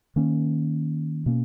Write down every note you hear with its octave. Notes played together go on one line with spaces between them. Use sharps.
D#3 A#3 C#4
B2 A#3 C#4